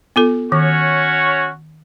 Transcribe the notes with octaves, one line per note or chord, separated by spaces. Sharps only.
B3 F4 A4
D#3 C#4 F#4 C#5